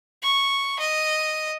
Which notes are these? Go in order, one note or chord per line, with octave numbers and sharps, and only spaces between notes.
C#6
D#5